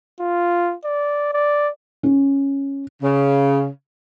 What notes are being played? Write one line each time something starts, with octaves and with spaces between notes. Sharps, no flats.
F4
D5
D5
C#4
C#3